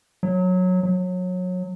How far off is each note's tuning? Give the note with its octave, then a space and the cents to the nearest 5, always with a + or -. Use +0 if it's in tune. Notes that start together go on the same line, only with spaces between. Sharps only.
F#3 -15
F#3 -25